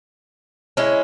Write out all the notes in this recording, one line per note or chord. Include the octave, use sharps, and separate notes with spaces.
G#3 C#4 E4